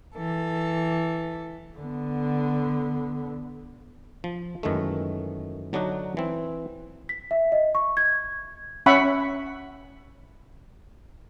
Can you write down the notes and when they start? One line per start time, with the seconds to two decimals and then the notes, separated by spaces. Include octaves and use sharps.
0.15 E3 A4
1.78 D3 B3
4.24 F3
4.63 F#2 D#3 E3 G#3 A3
5.73 D3 F#3 D4 D#4 F#4
6.17 E3 C4
7.09 B6
7.31 E5
7.52 D#5
7.75 C#6
7.97 G#6
8.86 C#4 E5 F#5 B5 C#6